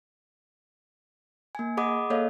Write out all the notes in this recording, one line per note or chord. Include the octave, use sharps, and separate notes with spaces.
A#3 G#5
G#4 D#5 F#5 B5 D6 D#6
A#3 A4 C#5 D#5 F5